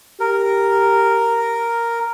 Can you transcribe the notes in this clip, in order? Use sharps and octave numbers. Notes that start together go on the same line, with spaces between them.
G4 A#4